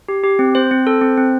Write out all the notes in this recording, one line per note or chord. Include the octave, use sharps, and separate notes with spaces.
G4
G4
C4
C4 C5
C4
A4
C4
C4